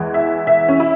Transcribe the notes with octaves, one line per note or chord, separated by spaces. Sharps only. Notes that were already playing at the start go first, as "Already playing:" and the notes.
Already playing: E2 E3 G#3
E5
E5
C#4
E4